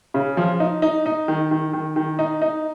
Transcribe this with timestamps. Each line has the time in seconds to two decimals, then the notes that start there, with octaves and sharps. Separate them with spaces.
0.14 C#3
0.37 F3
0.60 D#4
0.82 D#4
1.06 D#4
1.28 D#3
1.51 D#3
1.73 D#3
1.96 D#3
2.19 D#4
2.42 D#4